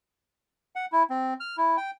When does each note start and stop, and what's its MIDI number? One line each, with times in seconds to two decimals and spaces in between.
0.76 0.86 78
0.92 1.03 64
1.10 1.34 60
1.40 1.56 89
1.57 1.77 64
1.77 1.91 79